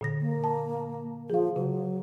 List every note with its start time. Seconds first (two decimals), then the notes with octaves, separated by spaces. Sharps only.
0.01 A#2 D3 A#6
0.21 A#3
0.44 A5
1.30 F3 G#4 F5
1.56 C#3 F#3